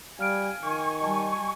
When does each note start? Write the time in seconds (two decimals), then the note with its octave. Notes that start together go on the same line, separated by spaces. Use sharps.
0.19 G3 F5 G#5 F6 D7
0.63 D#3 G#5 C#6
1.01 G3 D#5 G#5 A5